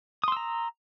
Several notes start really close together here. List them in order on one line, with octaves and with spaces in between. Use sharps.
D#6 C6 E6 A#5